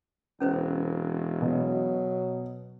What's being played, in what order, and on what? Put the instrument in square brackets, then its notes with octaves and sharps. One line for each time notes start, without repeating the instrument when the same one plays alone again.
[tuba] E1 [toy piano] C#4 B4 C5
[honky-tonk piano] B2 [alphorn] F#3